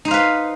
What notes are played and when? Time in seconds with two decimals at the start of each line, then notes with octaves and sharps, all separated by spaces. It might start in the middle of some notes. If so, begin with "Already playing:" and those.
0.05 D#4
0.08 C5
0.11 F5
0.14 B4